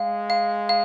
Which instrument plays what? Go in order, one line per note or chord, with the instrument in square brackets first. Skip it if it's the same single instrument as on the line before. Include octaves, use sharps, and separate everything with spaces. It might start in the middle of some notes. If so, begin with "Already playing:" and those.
Already playing: [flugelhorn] G#3 [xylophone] F5
[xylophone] F5
F5